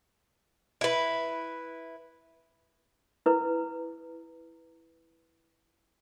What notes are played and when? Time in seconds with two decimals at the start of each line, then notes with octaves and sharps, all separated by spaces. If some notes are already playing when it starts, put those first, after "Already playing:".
0.81 E4 B4
3.26 E4 B4